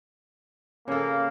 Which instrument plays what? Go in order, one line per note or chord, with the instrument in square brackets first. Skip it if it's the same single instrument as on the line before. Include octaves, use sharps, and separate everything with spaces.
[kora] C#3 A4 [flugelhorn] A#3